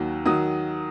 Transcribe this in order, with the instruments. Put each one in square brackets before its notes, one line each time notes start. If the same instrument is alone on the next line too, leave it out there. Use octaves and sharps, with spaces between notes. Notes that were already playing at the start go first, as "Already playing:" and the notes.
Already playing: [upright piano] D#2 D#3 F#3
D#3 F#3 D#6